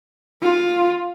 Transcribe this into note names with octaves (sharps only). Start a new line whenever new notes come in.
F4